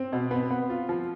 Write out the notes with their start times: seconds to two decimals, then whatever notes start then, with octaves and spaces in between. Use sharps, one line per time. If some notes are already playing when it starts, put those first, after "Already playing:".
Already playing: C4
0.13 B2
0.31 B3 C4
0.51 B3
0.70 F4
0.89 F3